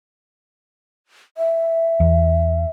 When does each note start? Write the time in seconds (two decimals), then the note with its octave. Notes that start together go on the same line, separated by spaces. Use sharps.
1.38 E5
2.00 E2